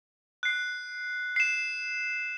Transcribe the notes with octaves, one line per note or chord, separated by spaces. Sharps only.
F#6 C7
C7 E7